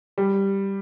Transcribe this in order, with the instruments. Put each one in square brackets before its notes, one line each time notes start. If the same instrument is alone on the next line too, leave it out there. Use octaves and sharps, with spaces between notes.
[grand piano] G3